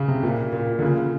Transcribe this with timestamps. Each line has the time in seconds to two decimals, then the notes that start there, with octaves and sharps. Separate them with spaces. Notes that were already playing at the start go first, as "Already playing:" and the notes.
Already playing: C#3
0.08 C3
0.23 A#2
0.53 A#2
0.79 D3
0.82 C#3